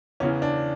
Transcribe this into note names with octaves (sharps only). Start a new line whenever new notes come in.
E2 C#3 E3 C#4
D4